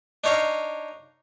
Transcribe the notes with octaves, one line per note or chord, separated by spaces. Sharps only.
D4 D#4 C#5 F5